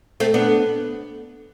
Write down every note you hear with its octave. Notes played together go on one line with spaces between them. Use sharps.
A3 C4
B3 D4